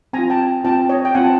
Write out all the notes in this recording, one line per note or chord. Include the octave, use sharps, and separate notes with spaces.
C4 G#5 A#5
F4
G5 A5
C4 F4 G5 A5
C#5 D#5
G5
C4 F4 F#5 G#5
A5